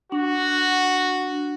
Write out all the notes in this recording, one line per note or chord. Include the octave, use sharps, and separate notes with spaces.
D4 F#4